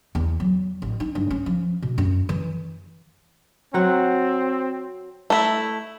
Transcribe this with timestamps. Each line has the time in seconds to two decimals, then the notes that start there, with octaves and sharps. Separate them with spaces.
0.15 E2
0.40 F#3
0.82 A1
1.00 D#4
1.15 G2
1.31 C#4
1.46 F3
1.82 B2
1.98 F#2
2.29 E3
3.74 F#3 C4 F#5
5.30 A3 E4